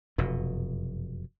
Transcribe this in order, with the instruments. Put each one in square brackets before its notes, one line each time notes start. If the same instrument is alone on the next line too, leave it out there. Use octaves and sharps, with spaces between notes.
[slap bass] F1 F#2 B2